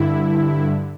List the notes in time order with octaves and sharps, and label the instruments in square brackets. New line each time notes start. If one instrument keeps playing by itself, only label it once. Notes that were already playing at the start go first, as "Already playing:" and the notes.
Already playing: [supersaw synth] G2 D3 E4